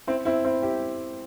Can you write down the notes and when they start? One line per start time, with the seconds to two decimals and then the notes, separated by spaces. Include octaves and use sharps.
0.07 C4 E4
0.25 C4 E4
0.45 C4 E4
0.62 E4 G4